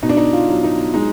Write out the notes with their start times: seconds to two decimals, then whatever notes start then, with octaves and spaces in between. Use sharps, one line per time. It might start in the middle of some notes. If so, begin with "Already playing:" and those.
0.03 B2 D#4
0.09 D4
0.17 D#4
0.33 F4
0.49 F#3
0.64 D#4
0.94 G#3 D#4